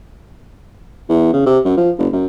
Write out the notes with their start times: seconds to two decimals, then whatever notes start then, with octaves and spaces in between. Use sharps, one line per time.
1.09 E2
1.33 C#3
1.46 C3
1.65 F#2
1.77 F3
1.98 F#1
2.13 F#2